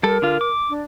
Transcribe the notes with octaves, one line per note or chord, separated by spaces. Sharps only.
G3 A4 A#4
D3 F4
D6
D4